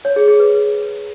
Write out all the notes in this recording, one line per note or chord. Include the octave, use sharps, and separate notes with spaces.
C#5
G#4
G#4
B4